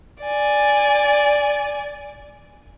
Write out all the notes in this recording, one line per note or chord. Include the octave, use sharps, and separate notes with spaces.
D5 G#5